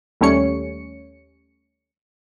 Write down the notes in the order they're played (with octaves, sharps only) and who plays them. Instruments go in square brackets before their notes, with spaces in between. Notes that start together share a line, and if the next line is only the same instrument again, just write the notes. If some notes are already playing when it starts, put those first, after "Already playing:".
[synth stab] D#2 G3 A3 C#4 C#5 C#7